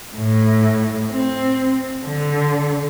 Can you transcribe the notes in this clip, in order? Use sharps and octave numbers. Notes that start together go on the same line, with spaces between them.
A2
C4
D3